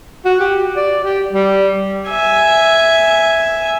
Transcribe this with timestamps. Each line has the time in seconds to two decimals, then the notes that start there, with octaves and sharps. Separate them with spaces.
0.25 F#4
0.40 G4
0.76 D5
1.04 G4
1.33 G3
2.10 E5 G#5